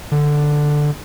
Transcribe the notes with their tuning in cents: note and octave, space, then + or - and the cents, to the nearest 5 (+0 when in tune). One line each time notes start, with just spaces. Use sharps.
D3 +5